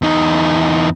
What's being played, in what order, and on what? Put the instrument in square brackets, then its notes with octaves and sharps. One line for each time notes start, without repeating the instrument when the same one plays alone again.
[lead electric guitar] E2 D#4